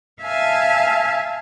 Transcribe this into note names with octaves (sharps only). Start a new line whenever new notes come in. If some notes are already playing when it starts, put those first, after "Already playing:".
E5 F5 G#5 A5